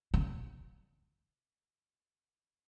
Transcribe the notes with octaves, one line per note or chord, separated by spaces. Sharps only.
C#3